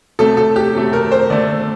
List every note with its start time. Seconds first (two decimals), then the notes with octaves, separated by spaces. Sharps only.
0.19 C3 F#3 A3 A4
0.37 A4
0.56 G4
0.74 C3 F#3 A3
0.93 A#4
1.11 C5
1.30 D3 A3 D5